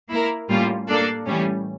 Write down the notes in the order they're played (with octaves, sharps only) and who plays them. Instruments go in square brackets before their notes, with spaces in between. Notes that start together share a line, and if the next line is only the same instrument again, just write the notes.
[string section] A#3 E4 A#4
A2 G3 A#3 C#4 F4
A#3 D4 A4 D5
A2 E3 G3 C#4